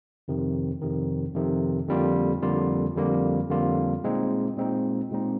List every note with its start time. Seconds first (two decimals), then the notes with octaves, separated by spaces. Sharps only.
0.28 F2 C3 D#3
0.81 F2 C3 D#3
1.35 F2 C3 D#3
1.89 F2 D3 G3 A#3 F4
2.42 F2 D3 G3 A#3 F4
2.95 F2 D3 G3 A#3 F4
3.50 F2 D3 G3 A#3 F4
4.04 A#2 G#3 C4 D#4
4.57 A#2 G#3 C4 D#4
5.11 A#2 G#3 C4 D#4